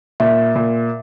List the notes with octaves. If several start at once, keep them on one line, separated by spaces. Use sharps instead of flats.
A#2 E5
A#2